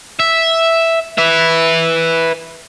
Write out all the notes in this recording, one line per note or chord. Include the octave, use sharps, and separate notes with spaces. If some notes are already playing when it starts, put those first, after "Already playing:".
E5
B4 E5